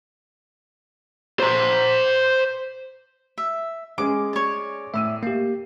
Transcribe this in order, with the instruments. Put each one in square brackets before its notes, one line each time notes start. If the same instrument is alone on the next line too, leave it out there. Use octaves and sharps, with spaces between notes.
[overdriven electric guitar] C5 A#5
[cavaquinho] E5
[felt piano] G#3 C#4 G#4 [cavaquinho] D6
[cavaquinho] C#5 D5
[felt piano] A2 E6 D#7 [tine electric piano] E5
[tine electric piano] A#3 G4 [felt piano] C7